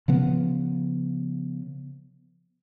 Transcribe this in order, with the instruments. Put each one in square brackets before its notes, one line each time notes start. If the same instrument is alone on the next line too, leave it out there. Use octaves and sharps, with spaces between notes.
[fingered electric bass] C#3 F3 B3